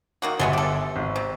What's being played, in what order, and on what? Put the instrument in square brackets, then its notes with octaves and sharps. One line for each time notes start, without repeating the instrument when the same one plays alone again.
[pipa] D#3 A#3 F#4
[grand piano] G1 E5 A6 [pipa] F#3 G#3 B3
[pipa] G4 A4
[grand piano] G#1
[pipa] C3